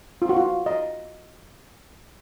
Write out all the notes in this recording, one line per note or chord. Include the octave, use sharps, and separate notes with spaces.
F4
F#4
F4
D#5